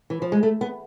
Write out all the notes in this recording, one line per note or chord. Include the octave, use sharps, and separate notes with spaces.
E3
F3
G#3
A3
B3